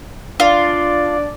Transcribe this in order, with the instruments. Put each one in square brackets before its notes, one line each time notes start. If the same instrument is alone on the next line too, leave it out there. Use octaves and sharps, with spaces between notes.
[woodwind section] D4 D5 [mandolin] F4